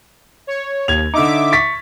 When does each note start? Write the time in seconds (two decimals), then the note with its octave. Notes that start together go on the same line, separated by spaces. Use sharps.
0.47 C#5
0.88 D#2 G#6 F7
1.14 D3 D#4 E5 D6
1.52 C#6 A6 B6